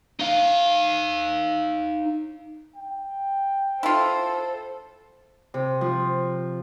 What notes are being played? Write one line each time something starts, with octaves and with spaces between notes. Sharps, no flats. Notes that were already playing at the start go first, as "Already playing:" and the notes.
D#4 F5
G5
E4 F4 A4 C5
C3
F3